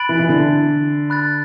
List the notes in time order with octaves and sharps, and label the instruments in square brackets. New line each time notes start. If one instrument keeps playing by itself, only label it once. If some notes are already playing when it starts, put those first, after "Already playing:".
Already playing: [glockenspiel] B5 F#6 A6 D7 F#7
[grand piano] E3
E3
D3
[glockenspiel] B5 F#6 A6